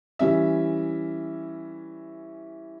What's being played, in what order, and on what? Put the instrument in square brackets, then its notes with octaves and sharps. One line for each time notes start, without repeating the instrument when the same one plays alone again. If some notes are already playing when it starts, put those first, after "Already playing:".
[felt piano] E3 G3 C#4 E5